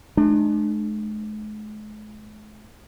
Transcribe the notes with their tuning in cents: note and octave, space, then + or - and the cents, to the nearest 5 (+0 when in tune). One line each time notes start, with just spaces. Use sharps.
G#3 +45 D4 +45